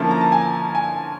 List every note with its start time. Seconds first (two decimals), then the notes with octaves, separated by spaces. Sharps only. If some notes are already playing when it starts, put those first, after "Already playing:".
Already playing: D3 F3 A#3 C#4 E4 A5
0.11 A#5
0.21 A5
0.32 G#5
0.75 G#5